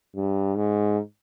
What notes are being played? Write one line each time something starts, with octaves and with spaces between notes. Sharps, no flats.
G2
G#2